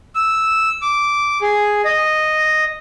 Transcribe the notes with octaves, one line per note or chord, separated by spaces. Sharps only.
E6
D6
G#4
D#5